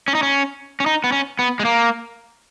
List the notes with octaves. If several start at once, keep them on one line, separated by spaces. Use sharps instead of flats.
C#4
D#4
C#4
C#4
D#4
B3
C#4
B3
G#3
A#3